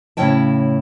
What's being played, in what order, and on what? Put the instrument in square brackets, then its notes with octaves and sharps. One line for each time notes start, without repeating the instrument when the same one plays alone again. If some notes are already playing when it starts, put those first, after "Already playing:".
[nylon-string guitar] A2 C#3 E4 C#5 G5 A5